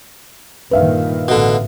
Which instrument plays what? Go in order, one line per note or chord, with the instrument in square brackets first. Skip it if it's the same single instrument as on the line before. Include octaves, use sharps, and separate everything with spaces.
[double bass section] G2 A#2 D#3 [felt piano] B4 E5 F5
[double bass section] A1 [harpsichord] B2 D3